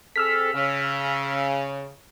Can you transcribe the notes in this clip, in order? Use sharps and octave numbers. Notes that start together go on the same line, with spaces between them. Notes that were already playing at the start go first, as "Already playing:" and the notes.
C4 G#4 A4 E6 F6 B6
C#3